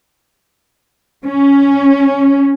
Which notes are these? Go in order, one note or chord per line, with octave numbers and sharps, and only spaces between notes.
C#4